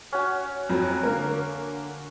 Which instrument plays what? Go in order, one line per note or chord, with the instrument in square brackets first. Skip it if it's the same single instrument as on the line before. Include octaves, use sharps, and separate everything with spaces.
[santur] C#4 F#4
[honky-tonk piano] F2 F#3
D3 A#3 A#4